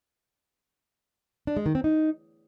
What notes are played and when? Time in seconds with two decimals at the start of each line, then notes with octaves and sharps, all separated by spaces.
1.47 D4
1.57 G#3
1.66 D#3
1.75 C4
1.84 D#4